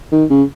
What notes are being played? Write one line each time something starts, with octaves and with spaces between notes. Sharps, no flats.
D#3
C#3